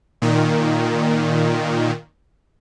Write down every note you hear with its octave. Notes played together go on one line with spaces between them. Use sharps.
A#2 D#3